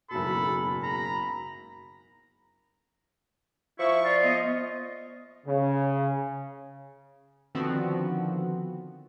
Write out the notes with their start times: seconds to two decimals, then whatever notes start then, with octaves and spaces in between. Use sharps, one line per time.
0.11 F#1 G#2 B2 A4 B5
0.84 A#5 B5
3.79 F3 E4 E5 C#6
4.05 F4 D5
4.23 B3 D#5
5.46 C#3
7.55 D3 D#3 F3 B3 C4 F#4